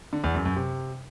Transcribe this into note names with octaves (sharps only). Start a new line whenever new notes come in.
D3
E2
F#2
F#2
C3